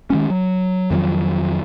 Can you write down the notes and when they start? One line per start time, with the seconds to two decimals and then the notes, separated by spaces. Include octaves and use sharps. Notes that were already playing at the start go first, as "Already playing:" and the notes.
0.10 D#3 G#3 C#4
0.30 F#3
0.91 F2 D#3 F3 F#3